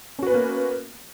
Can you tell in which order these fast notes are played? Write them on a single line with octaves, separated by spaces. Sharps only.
C#4 F#4 B4 B3 A#3